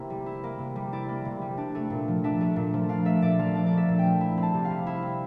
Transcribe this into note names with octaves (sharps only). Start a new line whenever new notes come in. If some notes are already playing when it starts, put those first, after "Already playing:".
Already playing: C3 A#3 E4
G3
E4
A#3
C3
G3
E4 D5
A#3
C3
G3
D4
A3
A#2
F3
D4 E5
A3
A#2
F3
D4 F5
A3 E5
A#2 D5
F3 F5
D4 D5
D5
A3
E5
A#2
G5
F3
E4
C4
A5
C3
F5
G3
E4
C4